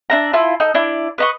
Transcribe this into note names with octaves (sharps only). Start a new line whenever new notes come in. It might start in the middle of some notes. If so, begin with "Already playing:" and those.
D4 E5 A#5
E4 F4 A5
D#4 A4
D4 E4
B4 D#5 C#6